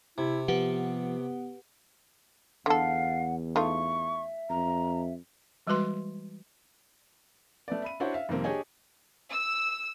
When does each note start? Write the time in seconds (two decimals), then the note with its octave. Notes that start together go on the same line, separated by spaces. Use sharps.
0.18 C3 E4
0.48 F3 B3 G4 B4 F#5
2.66 E2 D3 A4 F5 F#5
3.56 A3 D#4 F4 E5 C#6
4.50 F2 A#5
5.67 E3 G3 G#3 F#4 B4 C6
7.68 A3 B3 D5
7.82 E5 B5 D#7
8.00 D4 E4 F#4 C5 C#5
8.14 E5 F5
8.29 F2 C3 D#3 G3 A#3 C4
8.44 D4 G4 G#4 C#5 D#5 G#5
9.30 E6